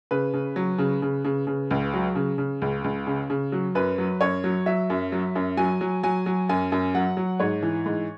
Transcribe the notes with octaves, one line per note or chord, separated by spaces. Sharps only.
C#3 B4
C#3
F#3
C#3
C#3
C#3
C#3
C#2
F#3
C#3
C#3
C#2
C#2
C#3
C#3
F#3
F#2 B4
F#3
F#2 C#5
F#3
F#3 E5
F#2
F#3
F#2
F#3 G#5
F#3
F#3 G#5
F#3
F#2 G#5
F#2
F#3 F#5
F#3
G#2 C#5
E3
G#2